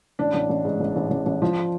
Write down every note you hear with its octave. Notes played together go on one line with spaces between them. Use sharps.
A1 D4
A1
A1
G#2
A1
A1
A1
A1
F3